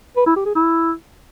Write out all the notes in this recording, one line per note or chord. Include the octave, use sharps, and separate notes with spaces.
B4
E4
G4
G#4
E4